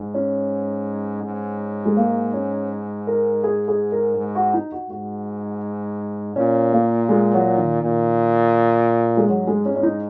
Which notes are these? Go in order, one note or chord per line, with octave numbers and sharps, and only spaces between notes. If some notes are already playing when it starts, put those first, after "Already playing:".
Already playing: G#2
C#4
G#2
G#3
A#3
C#4
A#4
G#4
G#4
A#4
G#2
F#4
D#4
F#4
G#2 F#4
A#2 C#4
A#3
G#3
F#3
D#3
A#2
G#3
G#2 F#3
G#3
C#4
C#4
D#4